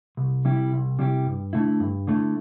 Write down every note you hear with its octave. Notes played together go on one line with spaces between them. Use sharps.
C2
C3 G3 E4 G4
C2
C3 G3 E4 G4
G2
D3 A3 E4
G2
D3 A3 E4